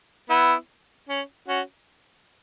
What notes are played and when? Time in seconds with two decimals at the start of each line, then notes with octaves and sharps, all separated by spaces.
0.30 B3 E4
1.09 C#4
1.48 C#4 F#4